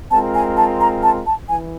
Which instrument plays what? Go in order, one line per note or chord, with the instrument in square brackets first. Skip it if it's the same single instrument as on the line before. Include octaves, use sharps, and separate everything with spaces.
[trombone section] G#3 C4 F4 A#4 [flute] A5
[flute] G#5
A5
A#5
A5
A5
[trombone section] E3 [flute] G#5